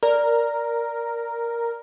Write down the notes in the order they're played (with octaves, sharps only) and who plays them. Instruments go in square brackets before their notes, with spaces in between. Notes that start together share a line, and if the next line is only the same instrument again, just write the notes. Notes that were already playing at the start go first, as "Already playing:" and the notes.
[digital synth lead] A#4 [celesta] D5